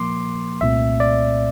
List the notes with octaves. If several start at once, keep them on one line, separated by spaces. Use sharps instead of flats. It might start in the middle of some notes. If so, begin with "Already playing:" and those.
Already playing: A#2 F3 A#3 C6 D6
C2 A#2 A3 C4 E5
D5